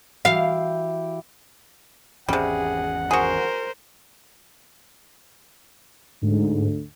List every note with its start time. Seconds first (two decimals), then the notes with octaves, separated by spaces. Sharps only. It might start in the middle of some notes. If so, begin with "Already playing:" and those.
0.25 E3 E4 F#4 G4 F5
2.29 G#1 E2 C3 G3 C#4 G#4 F#5
3.11 F#4 G#4 A#4 C5
6.22 D2 G#2